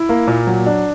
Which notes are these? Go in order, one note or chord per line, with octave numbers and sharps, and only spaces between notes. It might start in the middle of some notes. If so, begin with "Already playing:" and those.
Already playing: E4
A#3
A#2
F#3
D4